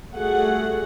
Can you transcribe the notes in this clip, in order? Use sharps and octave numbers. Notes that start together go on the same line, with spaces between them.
G3 A3 F#4 G#4 F#5